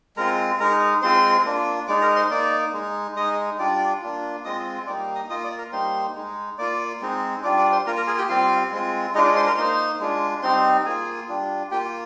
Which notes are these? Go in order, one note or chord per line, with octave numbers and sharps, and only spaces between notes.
G#3 C4 F4 A#4 A#5
G#3 D#4 A#4 A#5
G#3 C4 F4 C5 C6
A#3 D4 F4
G#3 D#4 D5 D6
A#4 A#5
C5 C6
A#3 D#4 D5 D6
G#3 D#4
G#3 D#4 D#5 D#6
G3 D4 F4 D5 D6
A#3 D4 F4
G#3 C4 F4 D#5 D#6
G3 A#3 D#4 D5 D6
D#5 D#6
A#3 F4 D#5 D#6
D5 D6
A#4 A#5
G3 A#3 D#4 C5 C6
G#3 D#4
A#3 F4 D5 D6
G#3 C4 D#4
G3 D4 F4 D5 D6
D5 D6
C5 C6
A#3 F4 A#4 A#5
A#4 A#5
G#4 G#5
G4 G5
G3 C4 F4 F5
G#3 C4 F4
G#3 D4 D#4 F4 D#5
D5 D6
C5 C6
A#4 A#5
A#3 D#4 C5 C6
G#3 D4 F4
G3 C4 D#4 C5 C6
A#3 F4 G#4 G#5
G3 D4 F4
A#3 F4 G4 G5